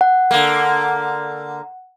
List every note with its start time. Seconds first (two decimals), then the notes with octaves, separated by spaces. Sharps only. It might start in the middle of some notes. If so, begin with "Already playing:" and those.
0.01 F#5
0.31 D3 A#3